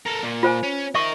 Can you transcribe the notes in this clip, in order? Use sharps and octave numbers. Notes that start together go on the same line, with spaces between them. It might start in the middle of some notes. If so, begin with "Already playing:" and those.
A4 A#4
A#2 A#3
F4 C5 G#5
C#4
A#4 D#5 E5 C#6